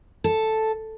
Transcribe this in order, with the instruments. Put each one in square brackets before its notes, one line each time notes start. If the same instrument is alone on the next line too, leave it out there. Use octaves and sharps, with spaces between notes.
[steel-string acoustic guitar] A4